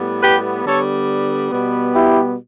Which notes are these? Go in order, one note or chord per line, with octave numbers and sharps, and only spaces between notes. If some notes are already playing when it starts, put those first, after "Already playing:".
Already playing: A2 G3 B3
G4 B4
D3 G3 B3 A4 C#5
B2 G3 B3
E4 G4